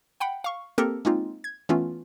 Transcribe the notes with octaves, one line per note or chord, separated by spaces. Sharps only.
F#5 G5 B5
F5 C#6
A#3 C4 G4 A4 A#4
G#3 A#3 C4 D#4 F4
G#6
E3 A3 B3 C#4 F4